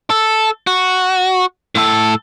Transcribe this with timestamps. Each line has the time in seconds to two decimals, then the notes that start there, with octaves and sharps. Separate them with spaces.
0.10 A4
0.67 F#4
1.75 A2 A4